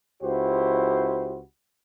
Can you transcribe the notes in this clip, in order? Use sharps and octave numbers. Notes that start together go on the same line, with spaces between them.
C#2 E4 F#4 G4 C5